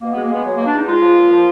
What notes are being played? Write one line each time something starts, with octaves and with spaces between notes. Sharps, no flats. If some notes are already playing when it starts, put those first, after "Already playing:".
B2 A#3
G#3 B3
A#3
G#3 B3
F#3
B2 A#3
D4
E2 D#4
G#3 F4
F3
A#2
F3